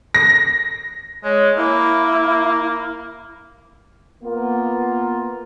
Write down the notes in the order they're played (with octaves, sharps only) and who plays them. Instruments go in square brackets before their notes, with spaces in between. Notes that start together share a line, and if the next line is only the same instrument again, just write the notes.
[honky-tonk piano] A#6
[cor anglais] G#3 [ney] C#5
[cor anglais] A#3 [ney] E4
[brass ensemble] A#3 B3 F4